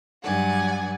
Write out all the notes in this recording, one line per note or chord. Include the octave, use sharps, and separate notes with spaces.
G2 F#3 D5 F#5 G#5